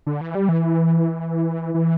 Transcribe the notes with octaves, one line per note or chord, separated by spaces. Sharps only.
D3
E3
G3
E3
E3